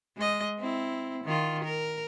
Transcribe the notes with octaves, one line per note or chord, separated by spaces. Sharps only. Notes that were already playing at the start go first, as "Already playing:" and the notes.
G#3 D#5
C4 E4
D#3 F4
A#4